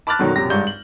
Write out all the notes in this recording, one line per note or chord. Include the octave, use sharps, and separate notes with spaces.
A5 B5 D6 F6 F#6 A6
F#2 B2 D3 D#3 F#3
A#1 F#2 C3 G4 A#6
G#1 G2 G#3 D4 G6 G7
F#7